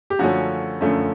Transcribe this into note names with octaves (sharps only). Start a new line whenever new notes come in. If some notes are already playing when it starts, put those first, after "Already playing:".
G4
F#2 D3 F3 A3 C#4 F#4
F#2 D3 F3 A3 C#4